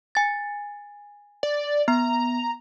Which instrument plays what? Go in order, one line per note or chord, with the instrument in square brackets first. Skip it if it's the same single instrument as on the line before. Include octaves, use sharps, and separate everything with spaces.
[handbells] G#5 A6
[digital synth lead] D5
[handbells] B3 [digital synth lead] A#5